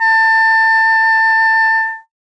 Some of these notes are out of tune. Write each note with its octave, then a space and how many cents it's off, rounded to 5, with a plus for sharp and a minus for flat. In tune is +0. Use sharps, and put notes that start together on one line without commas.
A5 +25